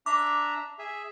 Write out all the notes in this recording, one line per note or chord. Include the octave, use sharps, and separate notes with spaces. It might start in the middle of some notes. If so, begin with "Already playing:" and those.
D4 E5 A#5 D6
G#4 E5